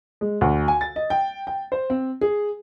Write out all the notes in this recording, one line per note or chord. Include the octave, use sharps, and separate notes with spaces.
G#3
D2
G#5
A6
D#5
G5
G5
C5
C4
G#4